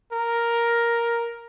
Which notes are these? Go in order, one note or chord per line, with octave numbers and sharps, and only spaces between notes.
A#4